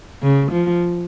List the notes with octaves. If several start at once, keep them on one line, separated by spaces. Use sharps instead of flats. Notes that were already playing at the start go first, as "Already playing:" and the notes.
C#3
F3